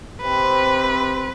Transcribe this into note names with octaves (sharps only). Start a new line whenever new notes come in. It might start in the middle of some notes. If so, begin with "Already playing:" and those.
C3 C4 B4